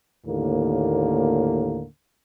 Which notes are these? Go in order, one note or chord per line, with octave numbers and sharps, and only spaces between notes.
D#2 A2 D3 A#3